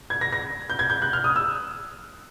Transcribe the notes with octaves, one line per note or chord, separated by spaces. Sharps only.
G#6
A#6
A#6
G6
G#6
G6
F#6
F6
D#6
E6